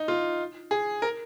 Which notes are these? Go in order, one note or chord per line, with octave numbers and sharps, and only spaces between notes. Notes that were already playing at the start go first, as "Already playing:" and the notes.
Already playing: D#4
F4
G#4
A#4